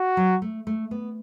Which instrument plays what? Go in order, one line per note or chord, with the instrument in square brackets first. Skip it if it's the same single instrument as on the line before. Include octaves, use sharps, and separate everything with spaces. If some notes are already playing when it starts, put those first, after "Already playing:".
Already playing: [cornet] F#4
[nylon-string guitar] F#3
A3
A3
B3